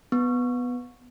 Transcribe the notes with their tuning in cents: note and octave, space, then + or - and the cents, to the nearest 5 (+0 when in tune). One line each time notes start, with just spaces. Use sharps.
B3 +0